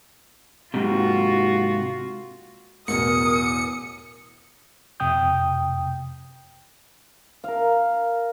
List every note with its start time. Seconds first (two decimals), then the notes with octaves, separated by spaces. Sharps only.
0.74 G#2 C3 F4 F#4
2.88 A1 E2 B2 A#4 D#6 C#7
5.00 F2 C3 G5 D#6 G6
7.44 A#4 F5